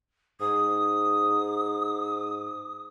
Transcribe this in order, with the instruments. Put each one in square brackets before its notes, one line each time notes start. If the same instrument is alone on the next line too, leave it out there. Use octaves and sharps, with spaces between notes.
[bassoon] G#2 [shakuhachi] D#6